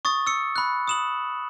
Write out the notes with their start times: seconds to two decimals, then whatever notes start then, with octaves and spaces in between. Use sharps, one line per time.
0.05 C#6 D#6 A6
0.27 E6 C#7
0.56 B5 F#6
0.88 D#6 E7 F#7